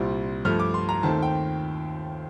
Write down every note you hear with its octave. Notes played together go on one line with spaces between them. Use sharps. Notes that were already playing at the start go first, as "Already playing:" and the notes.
Already playing: C2 A#2 G3 C4
G2 F3 A3 F6
D6
C6
A#5
D#2 D#3 A3 C4 A5
G5